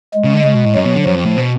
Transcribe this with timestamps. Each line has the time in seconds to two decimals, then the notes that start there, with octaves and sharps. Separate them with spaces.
0.14 G#3
0.24 C#3
0.34 D3
0.44 C#3 G#3
0.55 B2
0.65 A2
0.74 F#2 F#3
0.85 B2
0.95 D3
1.05 F#2 F3
1.15 F2
1.26 A2
1.36 B2